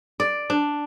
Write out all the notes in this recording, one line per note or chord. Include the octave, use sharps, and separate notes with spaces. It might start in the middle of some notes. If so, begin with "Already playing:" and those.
D5
D4